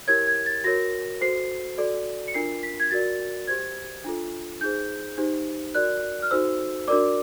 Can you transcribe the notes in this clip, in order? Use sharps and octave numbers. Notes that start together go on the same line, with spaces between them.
E4 G4 A#4 C#5 G#6
G#6
A6
F#4 A#4 C#5 A#6
F#4 A4 C5 C7
F#4 A4 D5
C#7
D4 F4 A#4 C7
B6
G#6
F#4 A#4 D5 A6
G4 C5 G#6
D4 F4 A4
D#4 G#4 C5 G6
D#4 G4 C5
F#4 A#4 D5 F#6
F6
D#4 F#4 A4 C5 E6
D4 F#4 A#4 D5 D6